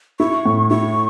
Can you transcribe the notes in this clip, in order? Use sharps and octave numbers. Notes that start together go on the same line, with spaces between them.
E4 C#6
A2
E4 C#6